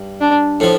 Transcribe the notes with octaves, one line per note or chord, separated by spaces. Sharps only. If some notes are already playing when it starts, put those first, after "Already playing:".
Already playing: G2
D4
A2 F3